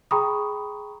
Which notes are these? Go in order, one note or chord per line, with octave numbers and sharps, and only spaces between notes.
G#4 G5 A#5 B5 C#6 D#6